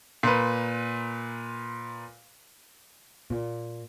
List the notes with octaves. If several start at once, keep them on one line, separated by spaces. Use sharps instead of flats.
A#2 B4
A#2